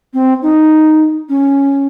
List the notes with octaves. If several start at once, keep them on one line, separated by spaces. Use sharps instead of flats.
C4
D#4
C#4